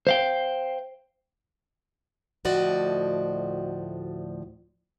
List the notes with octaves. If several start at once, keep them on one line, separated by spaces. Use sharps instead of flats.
C5 F5 G5
D2 A2 F3 F#4 D5 D#5